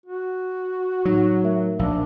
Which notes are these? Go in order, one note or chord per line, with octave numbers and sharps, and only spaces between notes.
F#4
A2 F#3 D#4
A3 A#4 E5
A#1 D4 F5 E6